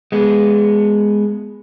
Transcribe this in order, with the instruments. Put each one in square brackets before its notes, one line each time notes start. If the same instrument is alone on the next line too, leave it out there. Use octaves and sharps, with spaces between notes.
[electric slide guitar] G#3 B3